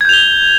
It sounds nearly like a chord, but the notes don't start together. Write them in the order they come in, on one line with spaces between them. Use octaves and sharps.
G#6 G6 F7 G7